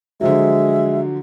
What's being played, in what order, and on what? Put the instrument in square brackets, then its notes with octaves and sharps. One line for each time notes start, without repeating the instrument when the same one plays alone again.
[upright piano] D3 F3 F#3 [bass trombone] G#3 [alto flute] E5